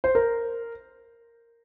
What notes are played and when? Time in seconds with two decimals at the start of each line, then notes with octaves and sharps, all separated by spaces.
0.04 C5
0.15 A#4